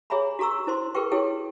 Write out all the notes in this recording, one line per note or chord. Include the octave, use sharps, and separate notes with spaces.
G#4 C#5 E5 G#5 A#5 B5
F#4 A4 A#5 C#6 E6
E4 C5 C6
G#4 A#4 B4 G5 C#6
E4 F#4 G#4 A4 C#5 G5